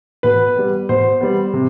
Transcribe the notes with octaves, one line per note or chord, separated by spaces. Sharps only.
B2 B4
G3 B3
B2 C5
G3 B3
C3